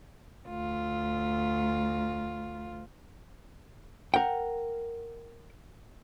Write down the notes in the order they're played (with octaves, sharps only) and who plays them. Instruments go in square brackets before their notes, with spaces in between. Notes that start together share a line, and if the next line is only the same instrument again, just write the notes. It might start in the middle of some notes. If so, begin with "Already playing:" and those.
[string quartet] D2 F4
[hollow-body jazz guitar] A#4 F#5 G5